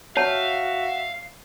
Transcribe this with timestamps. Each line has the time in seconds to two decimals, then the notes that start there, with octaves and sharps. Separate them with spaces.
0.17 F#4 C#5 E5 F5 A5